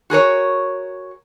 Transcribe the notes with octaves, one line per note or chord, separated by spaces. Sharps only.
F#4 G#4 A#4 C#5